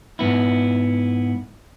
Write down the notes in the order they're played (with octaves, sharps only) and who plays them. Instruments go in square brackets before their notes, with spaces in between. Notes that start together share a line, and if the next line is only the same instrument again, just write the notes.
[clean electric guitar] G#2 B3 E4